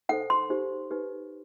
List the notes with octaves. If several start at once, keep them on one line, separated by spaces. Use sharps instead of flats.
D#4 A4 C5 F#5
C6
D#4 G4 C5
D#4 G4 B4